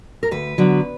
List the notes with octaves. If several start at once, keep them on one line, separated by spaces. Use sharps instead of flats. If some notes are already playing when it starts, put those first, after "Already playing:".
A#4
D2 B4
D3 F#3 B3